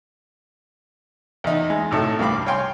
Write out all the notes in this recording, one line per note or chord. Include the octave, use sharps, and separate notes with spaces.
E2 D#4
G#3
G#1 A2 A4
C2 G2 F5 B5 D6
C#5 F5 G5 G#5 C6